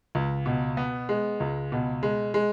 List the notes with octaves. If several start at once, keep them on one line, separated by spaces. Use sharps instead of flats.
C#2
B2
B3
G#3
C#2
B2
G#3
G#3